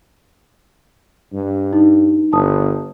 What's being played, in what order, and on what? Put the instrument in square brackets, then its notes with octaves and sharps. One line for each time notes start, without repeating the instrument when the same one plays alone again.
[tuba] G2
[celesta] D#4
[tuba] G1 [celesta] A5 D#6